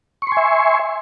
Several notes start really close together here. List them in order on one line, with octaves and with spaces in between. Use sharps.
C#6 C6 G#5 E5